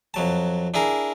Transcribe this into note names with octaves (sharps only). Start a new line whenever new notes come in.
F2 F#3 A5
D4 E4 G#4 A#4